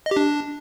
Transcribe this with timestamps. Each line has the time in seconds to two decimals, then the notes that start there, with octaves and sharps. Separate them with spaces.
0.06 D#5
0.11 G4
0.17 D4